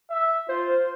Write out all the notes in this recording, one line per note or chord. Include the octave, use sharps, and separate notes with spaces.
E5
F4 C5